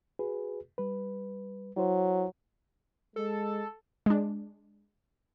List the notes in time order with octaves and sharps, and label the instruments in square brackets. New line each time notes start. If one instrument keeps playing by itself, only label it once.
[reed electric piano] F#4 G#4 B4
G3 B4
[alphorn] F#3 [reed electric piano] E4 C5
[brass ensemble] G#3 [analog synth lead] A4
[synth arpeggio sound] G#3 D4